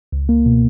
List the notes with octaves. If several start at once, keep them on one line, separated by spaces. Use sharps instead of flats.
C#2
A#3
B2